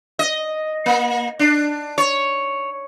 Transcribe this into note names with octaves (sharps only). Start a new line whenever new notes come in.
D#5
A#3
D4
C#5